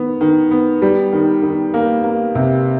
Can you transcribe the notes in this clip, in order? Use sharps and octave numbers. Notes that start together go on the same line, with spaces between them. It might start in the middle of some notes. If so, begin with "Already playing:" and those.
Already playing: D#3 B3
D#3
B3
G3
D#3
D#3
A#3
A#3
C3